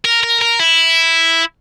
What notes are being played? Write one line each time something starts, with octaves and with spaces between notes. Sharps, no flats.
A#4
A#4
A#4
E4